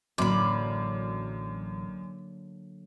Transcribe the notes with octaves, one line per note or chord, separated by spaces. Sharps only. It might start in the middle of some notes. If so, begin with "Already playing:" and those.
A1 F#2 D3 F#3 A#3 D5 B5